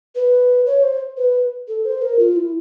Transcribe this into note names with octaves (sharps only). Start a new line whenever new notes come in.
B4
C#5
C5
B4
A4
C5
A#4
F4
E4